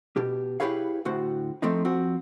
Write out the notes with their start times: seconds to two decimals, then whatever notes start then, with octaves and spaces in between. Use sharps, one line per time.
0.16 B2 G4
0.60 E4 G4 G#4 B4 C#5 F5
1.05 D2 A2 F#4 C5
1.62 F3 A3 C4 D#4
1.85 F2 C4 F#4